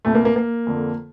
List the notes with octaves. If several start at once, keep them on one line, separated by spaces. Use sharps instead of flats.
C2 A#2 A3
A#3
A#3
A#3
F2 D3